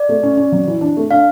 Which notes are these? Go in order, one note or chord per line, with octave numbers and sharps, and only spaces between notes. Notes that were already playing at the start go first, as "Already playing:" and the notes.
Already playing: D5
A3
C#4
C#4
F#3
E3
D4
A3
D4 F5